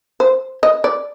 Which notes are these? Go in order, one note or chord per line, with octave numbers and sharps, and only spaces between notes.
C5
D#5
D5